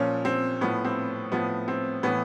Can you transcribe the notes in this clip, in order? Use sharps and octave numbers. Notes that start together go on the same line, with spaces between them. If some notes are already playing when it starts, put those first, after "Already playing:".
Already playing: A#2 F3 C#4
C4
A2 F3 B3
C4
A2 F3 B3
C4
A2 E3 B3